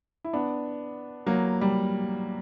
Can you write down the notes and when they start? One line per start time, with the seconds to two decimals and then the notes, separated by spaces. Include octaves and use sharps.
0.24 E4
0.33 B3 D4
1.26 F#3 A#3
1.61 G3